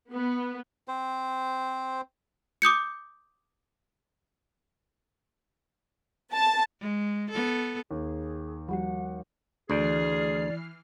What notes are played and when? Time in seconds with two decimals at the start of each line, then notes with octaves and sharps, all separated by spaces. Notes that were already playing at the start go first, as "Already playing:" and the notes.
0.13 B3
0.88 C4 C5
2.62 D6 D#6 G6 C#7
6.33 A5
6.81 G#3
7.30 B3 A4
7.91 D#2 G#4
8.69 F3 G3 F#4 F#5
9.70 D2 E3 G#4 D5 F6 C7